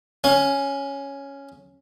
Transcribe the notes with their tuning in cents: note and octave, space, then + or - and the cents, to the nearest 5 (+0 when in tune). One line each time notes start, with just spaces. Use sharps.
C#4 +0 F5 +35